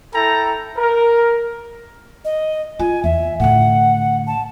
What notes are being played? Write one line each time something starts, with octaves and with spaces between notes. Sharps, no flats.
E4 A4 G5 A#5
A#4
D#5
F4 G#5
E2 E5
A2 D3 F#5
A5